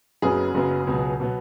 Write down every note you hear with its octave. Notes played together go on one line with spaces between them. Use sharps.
F#1 F#2 C#3 F#3 B3 G#4
F#1 F#2 C#3 F#3 B3
C#2 B2 F#3 B3
B2 F#3 B3